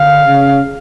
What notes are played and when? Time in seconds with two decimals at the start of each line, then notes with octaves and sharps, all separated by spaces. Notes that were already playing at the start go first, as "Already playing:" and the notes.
Already playing: D3 F5
0.24 C#3